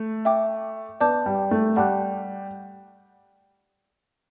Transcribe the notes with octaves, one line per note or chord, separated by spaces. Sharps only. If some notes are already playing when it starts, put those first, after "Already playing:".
Already playing: A3
E5 G5 D6
B3 D5 A5 D6 G6
G3
A3
G3 F#5 A5 D6 F#6